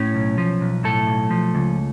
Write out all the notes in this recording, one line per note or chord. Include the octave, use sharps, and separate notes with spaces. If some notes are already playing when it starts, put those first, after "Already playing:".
Already playing: A2 C#4 C#5
B1
F3
B1
A2 A3 A4
B1
F3
C#2